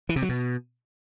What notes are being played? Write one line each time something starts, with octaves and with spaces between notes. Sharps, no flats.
E3
C3
F#3
B2